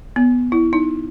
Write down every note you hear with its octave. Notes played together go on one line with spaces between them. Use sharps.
B3
E4
D#4